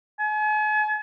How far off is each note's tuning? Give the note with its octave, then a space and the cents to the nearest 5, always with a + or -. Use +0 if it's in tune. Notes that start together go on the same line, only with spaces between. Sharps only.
G#5 +40